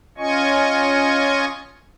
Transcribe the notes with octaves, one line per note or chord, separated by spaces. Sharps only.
C#4 F4 D#5 G#5 C#6